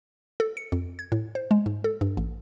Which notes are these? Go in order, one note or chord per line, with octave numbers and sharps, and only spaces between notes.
A4
C#7
F2
G#6
A2
C5
G#3
G#2
A4
G2
A1